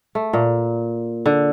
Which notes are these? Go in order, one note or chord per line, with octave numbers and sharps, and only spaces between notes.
A3
A#2
D3